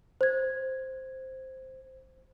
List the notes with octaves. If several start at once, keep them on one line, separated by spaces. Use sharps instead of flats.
C5 G#6